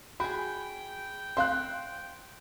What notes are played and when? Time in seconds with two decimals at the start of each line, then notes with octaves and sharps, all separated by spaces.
0.20 F#4 G#4 G5 B5
1.37 C4 F5 C6 F#6